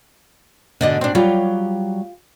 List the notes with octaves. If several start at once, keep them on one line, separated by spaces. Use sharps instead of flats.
G#2 B2 D3 D5 D#5
C4 D4
F#3 G3 F4 G4